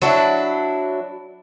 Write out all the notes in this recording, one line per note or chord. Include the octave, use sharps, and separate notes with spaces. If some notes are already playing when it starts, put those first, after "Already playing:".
F#3 D4 E4